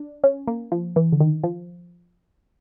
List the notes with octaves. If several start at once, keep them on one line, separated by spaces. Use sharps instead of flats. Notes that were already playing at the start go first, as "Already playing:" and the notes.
Already playing: D4
C#4
A#3
F3
E3
D3
D#3
F3